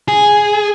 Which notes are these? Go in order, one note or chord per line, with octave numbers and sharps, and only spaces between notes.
G#4